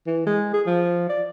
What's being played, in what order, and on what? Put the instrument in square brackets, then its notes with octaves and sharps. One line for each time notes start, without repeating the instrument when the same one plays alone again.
[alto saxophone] E3
G#3
G#4
F3
D5